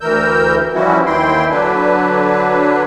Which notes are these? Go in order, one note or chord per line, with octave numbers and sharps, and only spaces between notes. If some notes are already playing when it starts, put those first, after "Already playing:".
D2 E3 A#4 E6 G6
E3 F3 G3 C#4 E4 F#4
D#2 E3 E4 G5 C6
D3 F#3 D4 B4